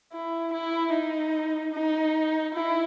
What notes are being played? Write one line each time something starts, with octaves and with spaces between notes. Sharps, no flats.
E4
E4
D#4
D#4
E4